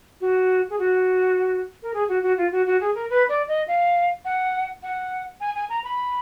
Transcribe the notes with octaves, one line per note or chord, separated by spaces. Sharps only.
F#4
G#4
F#4
A#4
G#4
F#4
F#4
F4
F#4
F#4
G#4
A#4
B4
D5
D#5
F5
F#5
F#5
G#5
G#5
A#5
B5